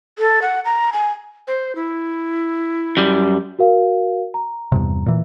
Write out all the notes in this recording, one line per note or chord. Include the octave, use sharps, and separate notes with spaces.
A4
F#5
A#5
G#5
C5
E4
F#2 G3
F#4 A#4 F5
A#5
E2 G2 C3
A#2 E3